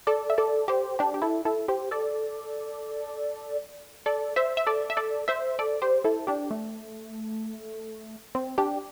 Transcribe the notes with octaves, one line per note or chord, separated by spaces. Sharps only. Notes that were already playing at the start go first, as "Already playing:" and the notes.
A4 D5
E5
A4 D5
G4 C5
D4 G4
G4
E4 A4
E4 A4
G4 C5
A4 D5
A4 D5
C5 E5
E5
A4 D5
E5
A4 D5
C5 E5
A4 D5
G4 C5
E4 A4
D4 G4
A3
C4
D4 G4